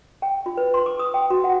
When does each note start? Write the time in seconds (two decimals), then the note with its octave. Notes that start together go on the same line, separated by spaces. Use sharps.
0.22 G5
0.46 F4
0.57 B4
0.74 C6
0.86 D6
0.99 D#6
1.14 G5
1.30 F#4
1.44 F#5